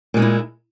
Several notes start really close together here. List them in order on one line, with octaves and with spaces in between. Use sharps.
A#2 G#3 D#4 E4